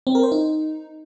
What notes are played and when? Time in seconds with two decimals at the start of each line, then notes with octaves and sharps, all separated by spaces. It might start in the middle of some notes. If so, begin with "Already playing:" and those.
0.07 C4
0.15 A#4
0.23 C5
0.32 D#4